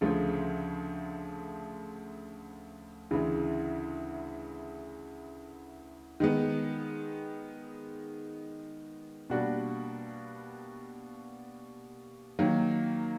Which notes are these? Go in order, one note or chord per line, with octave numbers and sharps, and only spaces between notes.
D2 C#3 F3 A3
D2 C#3 E3
D#3 G#3 B3
B2 G3 A#3 D4 F#4
D#3 F#3 A#3